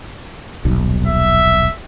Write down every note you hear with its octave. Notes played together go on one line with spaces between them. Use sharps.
D#1 B1
E5